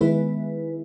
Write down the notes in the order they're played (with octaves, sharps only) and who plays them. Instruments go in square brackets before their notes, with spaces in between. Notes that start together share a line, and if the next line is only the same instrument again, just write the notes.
[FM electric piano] D#3 G#3 B3 E4 B4